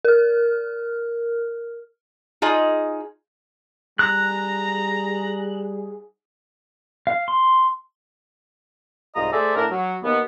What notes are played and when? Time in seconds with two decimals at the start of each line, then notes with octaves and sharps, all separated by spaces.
0.05 A#4 F6
2.42 D#4 F4 G#4 D#5
3.99 G3 G#4 A#5 F#6
7.07 F5
7.28 C6
9.15 C2 G#2 F4 D#5 A#5 D#6
9.32 A3 G#4 A4 C5 D5 E5
9.56 A2 D4 A#4
9.71 F#3
10.03 D#2 B3